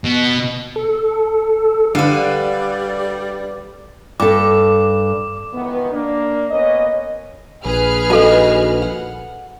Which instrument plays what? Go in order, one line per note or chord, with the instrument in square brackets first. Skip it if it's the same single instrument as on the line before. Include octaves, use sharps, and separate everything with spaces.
[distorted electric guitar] B2
[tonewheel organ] A4
[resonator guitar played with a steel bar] D3 [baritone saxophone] G3 [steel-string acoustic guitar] B4 F5 [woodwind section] D5
[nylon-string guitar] G2 A4 [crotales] D6
[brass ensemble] C#2 D#3 E3 B3
A#3 D4
A#3 B3 C#4 C#5 D#5
[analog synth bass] A#1 [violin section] G#4 B4 F6
[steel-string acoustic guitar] D#4 F#4 [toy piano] A4 F5 A5
[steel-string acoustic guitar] F#5